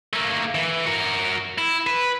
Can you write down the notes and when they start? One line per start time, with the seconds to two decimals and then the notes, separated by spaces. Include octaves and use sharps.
0.13 A3 A#3
0.55 E3
0.86 F#4 A#4
1.58 E4
1.87 B4